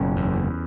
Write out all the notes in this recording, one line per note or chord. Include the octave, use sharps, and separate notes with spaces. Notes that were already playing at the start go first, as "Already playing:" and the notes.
Already playing: F#1 B2 C#4
E2